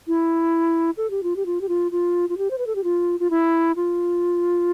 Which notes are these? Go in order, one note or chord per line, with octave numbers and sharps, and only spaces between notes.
E4
A4
G4
F4
G4
F4
G4
F4
F4
F4
G4
C5
B4
A4
G4
F4
F4
E4
F4